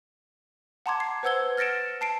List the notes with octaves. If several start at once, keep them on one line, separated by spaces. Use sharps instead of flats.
F#5 A5 A#5 C6 D6 G#6
C7
B4 C5 F#5 E6 G#6 G7
F6 A6 A#6 C#7 D7 E7
A5 C7 D7